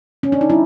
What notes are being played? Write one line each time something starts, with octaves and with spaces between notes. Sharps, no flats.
C#4
D4
D#4
G3 E4